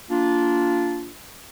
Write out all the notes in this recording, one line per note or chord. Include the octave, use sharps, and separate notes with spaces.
A#3 D4 F4